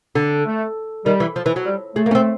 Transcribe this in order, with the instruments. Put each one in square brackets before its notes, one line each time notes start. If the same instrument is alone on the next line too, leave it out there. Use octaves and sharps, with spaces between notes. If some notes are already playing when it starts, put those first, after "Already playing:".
[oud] D3
[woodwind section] A3
[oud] D#3 [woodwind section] G3
[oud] E3
F3
E3
F#3
[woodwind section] G3
[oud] G#3 [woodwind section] A3
[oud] A#3
C#4
C4